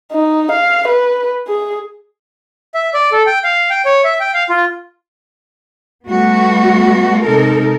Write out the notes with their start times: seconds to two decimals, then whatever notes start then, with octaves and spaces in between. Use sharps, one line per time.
0.12 D#4
0.51 F5
0.88 B4
1.48 G#4
2.74 E5
2.94 D5
3.12 A4
3.27 G5
3.44 F5
3.70 G5
3.85 C#5
4.04 E5
4.20 G5
4.34 F5
4.50 F4
6.08 G3 A3 B3 F#4
7.23 C3 G#3 D#4 A4 A#4